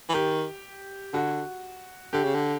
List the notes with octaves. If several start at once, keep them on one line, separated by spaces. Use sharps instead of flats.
E3
D#3 G4
D3 F#4
D3 G4
C#3
D3